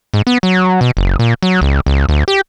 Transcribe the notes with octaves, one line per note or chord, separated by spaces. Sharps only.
G#2
B3
F#3
B2
F#1
A#2
F#3
C#2
C#2
D2
G4